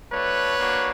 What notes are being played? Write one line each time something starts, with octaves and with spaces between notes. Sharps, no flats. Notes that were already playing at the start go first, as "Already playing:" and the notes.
A3 D4 F#4 B4 C#5
A#3 D4 F#4